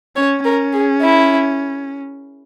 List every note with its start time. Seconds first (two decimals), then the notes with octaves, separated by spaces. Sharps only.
0.16 C#4 C#5
0.44 C#4 A#4
0.73 G#4
1.02 E4